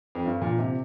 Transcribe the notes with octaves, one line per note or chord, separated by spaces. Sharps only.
F2
G2
A#2
C3